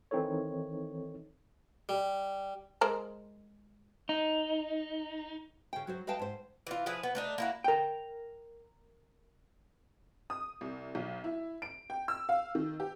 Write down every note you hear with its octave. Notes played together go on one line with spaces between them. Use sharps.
D#3 E3 C4 D#4 A4 C#5
G3
G#3 A#4 C5
D#4
C#3 G5
F#3 F#4 C5
B4 D#5 F5 G5 A5
G#2 C5
E3 F4
F3 E4 G#4 B4
B3
A3 D4 D#4
A#3 E4 F#4
A#4 G5
D#6
C2
B1
E4
D7
G5
E6
F5
D#3
G4